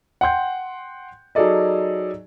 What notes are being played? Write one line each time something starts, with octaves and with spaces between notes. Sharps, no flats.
F#5 G5 C6 G6
F#3 D#4 G#4 A4 D5 D#5